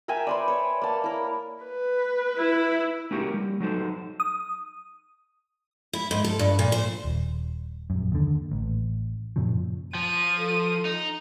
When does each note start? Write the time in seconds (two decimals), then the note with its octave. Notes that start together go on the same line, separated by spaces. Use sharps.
0.08 A#4 E5 G5 G#5
0.27 B4 C5 D5
0.48 C#5 D5
0.82 A#3 A5
1.04 E4 A#4
1.64 B4
2.37 E4
3.11 A#3 C#4 E4 F#4 G4 A#4
3.34 G3
3.60 F#3 D#4 A4 C5
4.20 D#6
5.93 E4
6.11 G#2
6.24 A4
6.39 G2
6.59 A#2
6.72 C5
7.05 D#1
7.90 A#1 F#2
8.12 D#2 D3
8.52 A1
9.36 F#2 A#2 C#3 F3
9.95 F3 D#7
10.37 A4
10.85 D#4